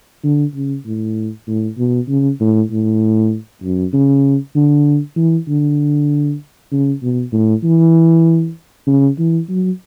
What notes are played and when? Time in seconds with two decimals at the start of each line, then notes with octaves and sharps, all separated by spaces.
0.24 D3
0.55 C#3
0.86 A2
1.48 A2
1.78 B2
2.09 C#3
2.40 A2
2.71 A2
3.64 F#2
3.93 C#3
4.55 D3
5.17 E3
5.48 D3
6.72 C#3
7.03 B2
7.33 A2
7.64 E3
8.87 C#3
9.19 E3
9.49 F#3